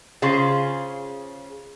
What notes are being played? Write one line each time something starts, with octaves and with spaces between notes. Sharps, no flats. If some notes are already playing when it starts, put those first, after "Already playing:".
C#3 F4 G#4 C5